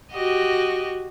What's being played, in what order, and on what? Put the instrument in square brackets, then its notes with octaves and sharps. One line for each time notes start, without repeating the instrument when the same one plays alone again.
[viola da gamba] F#4 G4 D#5